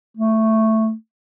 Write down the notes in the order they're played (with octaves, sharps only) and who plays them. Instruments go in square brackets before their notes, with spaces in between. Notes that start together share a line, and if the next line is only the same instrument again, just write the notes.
[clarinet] A3